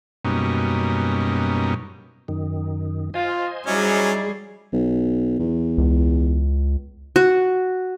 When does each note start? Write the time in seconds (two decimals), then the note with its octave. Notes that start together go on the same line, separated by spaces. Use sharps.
0.25 F#2 B2 G3 A#3 C#4 D#4
2.28 F#2 D#3
3.14 F4 C5 D#5 G#5
3.66 F#3 G3 C#4 D#4 E4 G#4 D5
4.73 B1
5.39 E2
5.78 C#2
7.16 F#4